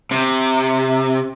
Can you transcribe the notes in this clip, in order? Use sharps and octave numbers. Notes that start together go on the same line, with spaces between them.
C3